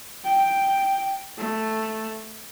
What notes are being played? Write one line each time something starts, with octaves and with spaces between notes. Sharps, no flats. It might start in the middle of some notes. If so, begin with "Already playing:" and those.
G5
A3